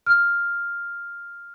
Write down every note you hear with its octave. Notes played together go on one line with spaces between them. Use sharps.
F6